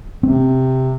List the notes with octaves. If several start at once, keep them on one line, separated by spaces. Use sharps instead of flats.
C3 C4